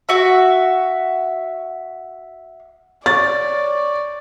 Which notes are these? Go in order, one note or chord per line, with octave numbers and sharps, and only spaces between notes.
F#4 E5
C#5 D5 A6